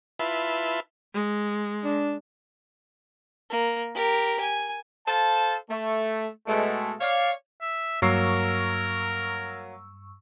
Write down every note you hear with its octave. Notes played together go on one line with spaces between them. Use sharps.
E4 F4 B4 E5 A5 C6
G#3
D4
A#3
G4 A#4
G#5
A4 C5 F5 A5
A3
B2 G#3 A3
C#5 D5 F5
E5
G2 F#3 A#3 A#4 C#6 E6 C7